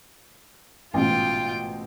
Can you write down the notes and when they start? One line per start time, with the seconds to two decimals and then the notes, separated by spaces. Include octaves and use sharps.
0.94 A1 G#2 B2 F4 G5